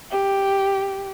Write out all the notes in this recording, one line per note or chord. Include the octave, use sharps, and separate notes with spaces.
G4